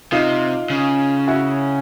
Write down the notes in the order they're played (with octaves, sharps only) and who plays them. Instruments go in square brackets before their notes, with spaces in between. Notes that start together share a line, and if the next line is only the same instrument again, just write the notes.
[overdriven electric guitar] C3 [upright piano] D#4 F4
[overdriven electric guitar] C#3
[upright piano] E4 F#4